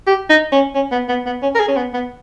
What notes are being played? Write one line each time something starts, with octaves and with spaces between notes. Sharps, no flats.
G4
D#4
C#4
C#4
B3
B3
B3
C#4
A#4
G#4
C#4
B3
B3